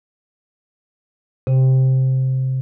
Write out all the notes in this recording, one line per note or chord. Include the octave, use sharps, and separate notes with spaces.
C3